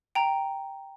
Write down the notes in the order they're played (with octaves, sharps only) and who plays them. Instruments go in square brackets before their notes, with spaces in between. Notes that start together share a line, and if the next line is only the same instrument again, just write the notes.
[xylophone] G5 A#5